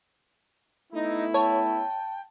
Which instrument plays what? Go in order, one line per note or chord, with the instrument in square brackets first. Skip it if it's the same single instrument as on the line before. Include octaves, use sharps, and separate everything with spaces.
[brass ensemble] A3 B3 E4 [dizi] D#4
[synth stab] C#5 [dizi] G5 [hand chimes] A5